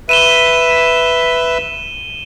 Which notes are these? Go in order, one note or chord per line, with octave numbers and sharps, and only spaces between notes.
B4 E5 D#7 E7 G7